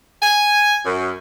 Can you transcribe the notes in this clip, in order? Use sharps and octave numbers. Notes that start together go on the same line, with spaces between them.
G#5
F#2